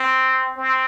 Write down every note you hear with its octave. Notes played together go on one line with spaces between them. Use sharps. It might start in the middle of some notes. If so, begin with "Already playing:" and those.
Already playing: C4
C4